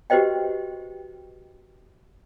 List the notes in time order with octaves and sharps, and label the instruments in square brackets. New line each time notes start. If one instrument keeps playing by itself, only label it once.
[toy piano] F#4 G4 B4 C5 D#5 G5